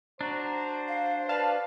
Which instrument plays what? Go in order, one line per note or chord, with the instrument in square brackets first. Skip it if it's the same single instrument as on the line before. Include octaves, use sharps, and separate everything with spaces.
[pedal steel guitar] D4 F#4 [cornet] C5 [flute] A#5
[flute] F5
[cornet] B4 [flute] D5 [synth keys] F5 A5